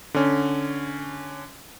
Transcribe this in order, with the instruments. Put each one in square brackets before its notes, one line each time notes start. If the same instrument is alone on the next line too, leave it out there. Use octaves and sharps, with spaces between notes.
[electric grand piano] D3 C#4